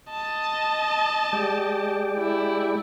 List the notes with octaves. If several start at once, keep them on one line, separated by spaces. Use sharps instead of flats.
D#5 A5
G#3 G4 D5
E4